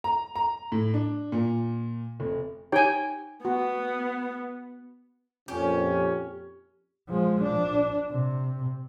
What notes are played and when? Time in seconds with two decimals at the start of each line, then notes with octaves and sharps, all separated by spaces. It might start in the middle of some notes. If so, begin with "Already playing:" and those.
0.04 A#5
0.36 A#5
0.72 A2
0.94 D4
1.32 A#2
2.20 F1
2.72 D#4 G4 C#5 G5 G#5
3.45 B3 F#4
5.48 F2 A#2 C#4 G4
7.10 F3 G#3
7.42 D4
8.11 C3